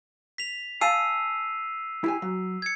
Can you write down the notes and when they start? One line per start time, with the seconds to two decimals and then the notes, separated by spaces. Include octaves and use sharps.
0.38 B6 F7
0.81 F5 G#5 A5 E6 C7 D#7
2.04 E4 G4 G#5
2.22 F#3
2.62 G#6 C#7